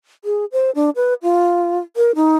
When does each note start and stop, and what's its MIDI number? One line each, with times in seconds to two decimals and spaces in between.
0.25 0.45 68
0.52 0.71 72
0.75 0.90 62
0.96 1.14 71
1.22 1.79 65
1.96 2.11 70
2.15 2.37 63